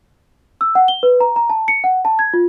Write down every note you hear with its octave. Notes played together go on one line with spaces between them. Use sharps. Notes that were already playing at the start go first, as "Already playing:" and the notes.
E6
F#5
G7
B4
A#5
A#5
A5
C#7
F#5
A5
G#6
F4